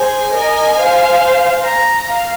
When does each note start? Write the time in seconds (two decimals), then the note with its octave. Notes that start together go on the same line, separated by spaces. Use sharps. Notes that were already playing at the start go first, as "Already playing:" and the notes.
Already playing: G#4 C5 G#5
0.32 A#4 D#5
0.76 C5 F5
1.64 A#5
2.06 F5